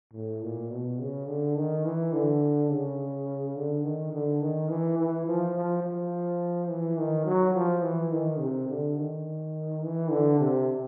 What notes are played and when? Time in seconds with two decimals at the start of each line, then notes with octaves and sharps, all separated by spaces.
0.13 A2
0.42 A#2
0.71 B2
0.99 C#3
1.28 D3
1.56 D#3
1.85 E3
2.13 D3
2.70 C#3
3.55 D3
3.83 D#3
4.13 D3
4.41 D#3
4.69 E3
4.98 E3
5.26 F3
5.55 F3
5.83 F3
6.69 E3
6.98 D#3
7.25 F#3
7.54 F3
7.82 E3
8.11 D#3
8.39 C3
8.68 D3
8.96 D#3
9.82 E3
10.10 D3
10.39 C3